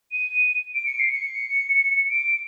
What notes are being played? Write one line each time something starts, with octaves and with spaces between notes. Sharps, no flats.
D#7
D7
C#7
C7
C#7
D7